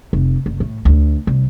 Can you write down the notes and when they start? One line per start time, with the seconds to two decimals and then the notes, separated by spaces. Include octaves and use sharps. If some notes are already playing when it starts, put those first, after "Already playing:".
0.13 F1
0.46 F#1
0.60 A2
0.85 D2
1.27 C2